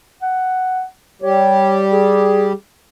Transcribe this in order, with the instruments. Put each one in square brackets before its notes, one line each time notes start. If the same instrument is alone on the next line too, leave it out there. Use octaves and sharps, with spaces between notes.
[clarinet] F#5
[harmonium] G3 G4 [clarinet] C#5
[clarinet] G#4